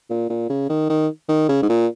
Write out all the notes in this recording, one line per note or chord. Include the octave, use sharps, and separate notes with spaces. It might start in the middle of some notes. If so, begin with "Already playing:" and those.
A#2
A#2
C#3
D#3
D#3
D#3
C#3
G#2
A#2